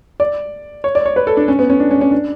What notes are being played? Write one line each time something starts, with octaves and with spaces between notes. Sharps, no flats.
D5
C#5
D5
C#5
B4
A4
D4
C#4
B3
C#4
D4
C#4
C#4
D4